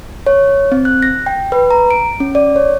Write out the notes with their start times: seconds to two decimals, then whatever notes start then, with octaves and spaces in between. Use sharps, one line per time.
0.27 C#5
0.72 C4
0.85 F#6
1.02 A#6
1.26 G5
1.52 B4
1.71 A#5
1.91 D7
2.20 C#4
2.35 D5
2.56 C#5